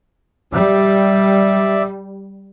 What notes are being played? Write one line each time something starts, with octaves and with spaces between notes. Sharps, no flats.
G3 D5 E5